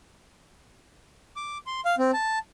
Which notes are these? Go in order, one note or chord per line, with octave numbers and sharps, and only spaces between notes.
D6
C6
F5
C4
A5